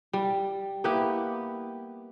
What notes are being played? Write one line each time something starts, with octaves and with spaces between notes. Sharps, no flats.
G3
A#3 B3 E4 G4